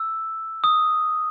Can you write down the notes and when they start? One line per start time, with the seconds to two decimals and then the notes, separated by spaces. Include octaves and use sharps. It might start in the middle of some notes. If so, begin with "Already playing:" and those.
Already playing: E6
0.64 D#6